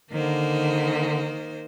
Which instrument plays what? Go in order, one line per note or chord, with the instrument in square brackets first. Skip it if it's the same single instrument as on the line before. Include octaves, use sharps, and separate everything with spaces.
[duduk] D3 [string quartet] D#3 A#3 C5